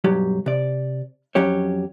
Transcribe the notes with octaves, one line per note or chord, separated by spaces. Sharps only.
B1 G2 F#3 G4
C3 D5
F2 F#3 C#4 G4 C#5